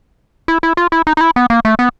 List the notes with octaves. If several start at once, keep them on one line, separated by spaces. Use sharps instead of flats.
E4
E4
F4
E4
D#4
D#4
E4
B3
A#3
A3
B3